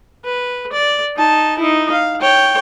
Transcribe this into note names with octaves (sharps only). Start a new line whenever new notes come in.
B4
D5
D#4 A5
D#4 E4
F5
C#5 G5